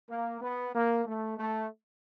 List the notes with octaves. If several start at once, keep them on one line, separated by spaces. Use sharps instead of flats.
A#3
B3
A#3
A3
A3